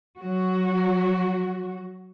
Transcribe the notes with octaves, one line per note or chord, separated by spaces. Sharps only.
F#3 F#4